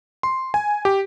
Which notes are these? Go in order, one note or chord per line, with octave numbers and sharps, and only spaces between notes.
C6
G#5
G4